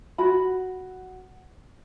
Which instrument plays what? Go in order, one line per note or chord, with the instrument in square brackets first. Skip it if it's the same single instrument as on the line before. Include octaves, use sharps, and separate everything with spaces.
[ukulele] F#4 B5